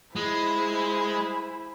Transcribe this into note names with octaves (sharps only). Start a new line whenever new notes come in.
G#3 E4 G#4 C5 B5